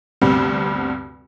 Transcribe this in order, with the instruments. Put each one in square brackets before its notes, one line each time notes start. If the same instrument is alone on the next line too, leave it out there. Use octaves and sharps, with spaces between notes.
[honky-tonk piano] D2 G2 C3 G3 B3 C4